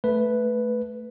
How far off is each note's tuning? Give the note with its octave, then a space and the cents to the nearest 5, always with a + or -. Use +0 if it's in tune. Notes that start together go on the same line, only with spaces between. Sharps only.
A3 +0 B4 +0